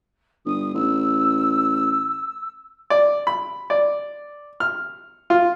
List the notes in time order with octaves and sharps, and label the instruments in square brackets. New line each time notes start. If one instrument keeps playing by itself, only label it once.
[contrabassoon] G1 [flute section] D#6
[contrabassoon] A1 [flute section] E6
[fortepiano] D5
B5
D5
F6
F4